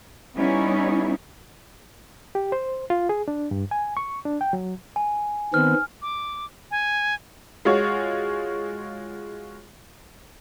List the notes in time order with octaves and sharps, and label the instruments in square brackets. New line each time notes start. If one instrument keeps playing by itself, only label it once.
[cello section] G3 B3 C#4 D#4 E4
[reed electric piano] G4
C5
F4
G#4
D4
G2
G#5
C#6
D4
G5
F#3
[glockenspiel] G#5
[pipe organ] D#3 B3 C4 [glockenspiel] F6
[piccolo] D6
G#5
[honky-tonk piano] G#3 F4 F#4 C#5